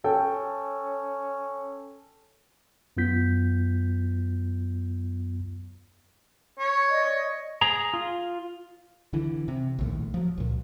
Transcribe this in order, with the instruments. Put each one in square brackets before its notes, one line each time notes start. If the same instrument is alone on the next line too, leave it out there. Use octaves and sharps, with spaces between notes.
[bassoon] C#4 [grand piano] A4 G5
[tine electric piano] F#2 F#3 B3 F4 G6 B6
[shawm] C#5
[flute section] D5 D#5
[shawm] C#5
[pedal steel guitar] G#4 A#5
F4
[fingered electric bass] D3 E3
C3
A#1 D#2 A2
F3 F#3
C#2 A#2